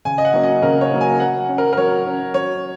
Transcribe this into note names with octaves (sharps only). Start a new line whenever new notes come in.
C#3 G#5
D#5
F#5
F#3 A#3 C#4
D#5
C#3 A#4
C#5
F#3 A#3 C#4
G#5
F#3 F#5
C#4
A#4
A#4
F#3 C#5
C#4
F#3 C#5